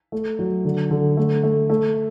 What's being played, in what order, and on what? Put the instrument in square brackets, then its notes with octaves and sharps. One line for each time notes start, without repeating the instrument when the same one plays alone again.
[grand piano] A3
F#3
D3
D3
A3
A3
A3